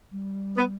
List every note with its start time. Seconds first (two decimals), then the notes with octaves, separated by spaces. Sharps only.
0.12 G3
0.57 B3